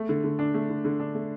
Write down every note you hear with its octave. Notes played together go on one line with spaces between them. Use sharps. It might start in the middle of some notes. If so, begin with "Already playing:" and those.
Already playing: A3
D3
D3
D4
A3
D3
D3
D4
A3